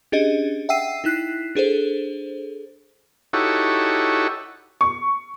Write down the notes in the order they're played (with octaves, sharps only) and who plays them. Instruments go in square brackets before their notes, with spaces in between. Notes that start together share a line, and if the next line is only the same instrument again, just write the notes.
[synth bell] C#4 D4 G4 G#4 D#5
E5 F#5 G5 E6 C7 D#7
D#4 E4 F#6 B6 C7
D4 G#4 A4 C5
[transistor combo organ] D#4 E4 F#4 G4 A4 C#5
[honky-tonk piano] C#6